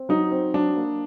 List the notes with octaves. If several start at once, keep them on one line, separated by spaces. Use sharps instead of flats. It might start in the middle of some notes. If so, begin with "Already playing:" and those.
Already playing: C4
F#3 D#4
C4
F#3 D4
A#3